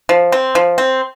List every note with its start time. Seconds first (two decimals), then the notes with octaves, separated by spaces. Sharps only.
0.09 F3
0.32 C4
0.55 F3
0.78 C4